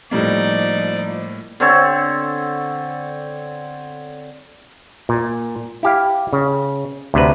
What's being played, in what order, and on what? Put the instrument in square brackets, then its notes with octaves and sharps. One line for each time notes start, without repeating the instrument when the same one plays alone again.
[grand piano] A2 G3 A#3 [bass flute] F3 [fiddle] D#4 D5
[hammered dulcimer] D3 C4 A4 C#5
[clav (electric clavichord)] A#2
E4 G4 F5
C#3
D2 C3 B4